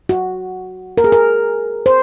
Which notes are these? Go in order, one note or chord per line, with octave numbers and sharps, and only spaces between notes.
F#4
A#4
G#4
A#4
C5